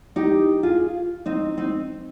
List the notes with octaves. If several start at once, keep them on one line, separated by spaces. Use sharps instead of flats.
D#4 G4
F4 G#4
C4 D#4
C4 D#4